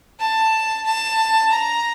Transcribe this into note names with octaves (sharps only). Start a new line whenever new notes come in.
A5
A5
A#5